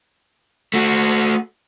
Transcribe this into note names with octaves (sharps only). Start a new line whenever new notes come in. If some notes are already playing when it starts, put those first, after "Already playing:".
A3 F#4